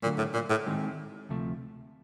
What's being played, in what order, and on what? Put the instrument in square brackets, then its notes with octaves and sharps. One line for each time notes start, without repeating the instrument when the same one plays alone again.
[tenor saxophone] A#2 [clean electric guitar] D3 F#3 A3
[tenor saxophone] A2
A#2
A2
[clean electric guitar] D#3 G#3 C4 D#4 G4
D2 C3 F3 A3